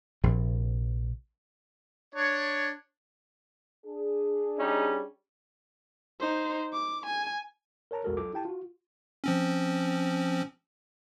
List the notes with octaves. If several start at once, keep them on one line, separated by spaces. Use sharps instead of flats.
A#1 C3 F3
D4 C#5
D4 G#4
G3 C#4 D#4
D#4 C5
D6
G#5
A#4 C#5 A5 A#5
B1 E2 G#3 F#4 A4 A#4
F#3 F4 A4 D6
E4 G4 G5 A5
F4 F#4
F3 C4 C#4